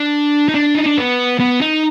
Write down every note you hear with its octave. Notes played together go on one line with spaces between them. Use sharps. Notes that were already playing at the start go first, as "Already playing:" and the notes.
Already playing: D4
D#4
D4
D#4
D4
B3
B3
D#4